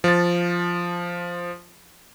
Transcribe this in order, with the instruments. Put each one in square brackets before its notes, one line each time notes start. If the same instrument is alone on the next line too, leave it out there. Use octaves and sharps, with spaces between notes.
[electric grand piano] F3 A6